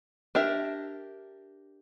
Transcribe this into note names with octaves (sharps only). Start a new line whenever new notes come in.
D4 G4 A#4 E5